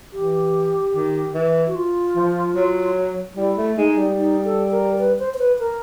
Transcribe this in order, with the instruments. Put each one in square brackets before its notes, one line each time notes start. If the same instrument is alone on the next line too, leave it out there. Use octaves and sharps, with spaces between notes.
[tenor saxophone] E3 [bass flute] G4
[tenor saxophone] D#3
E3
[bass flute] F#4
F4
[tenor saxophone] F3
F#3
[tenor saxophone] G3 [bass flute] E4
[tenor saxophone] A3
[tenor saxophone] G#3 [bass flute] D#4
[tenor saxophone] G3
[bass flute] D#4
A4
A#4
B4
C5
C5
B4
A#4